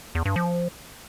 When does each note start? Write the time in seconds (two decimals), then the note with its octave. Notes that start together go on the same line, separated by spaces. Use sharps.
0.15 E2
0.25 G2
0.36 F3